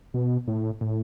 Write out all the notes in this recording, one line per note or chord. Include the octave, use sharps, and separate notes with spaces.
B2
A2
A2